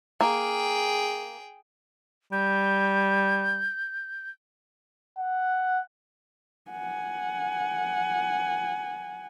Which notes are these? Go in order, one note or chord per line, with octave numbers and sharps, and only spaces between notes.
A#3 G#4 G5
G3 G6
F#5
F#5 G#5